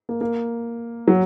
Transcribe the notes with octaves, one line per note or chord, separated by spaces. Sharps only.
A#3
A#3
F#3